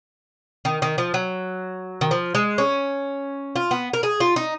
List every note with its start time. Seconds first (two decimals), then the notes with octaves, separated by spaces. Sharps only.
0.65 D#3
0.82 D#3
0.98 F3
1.14 F#3
2.01 D#3
2.11 F3
2.35 G#3
2.58 C#4
3.56 F4
3.71 B3
3.93 A#4
4.03 G#4
4.20 F4
4.36 D#4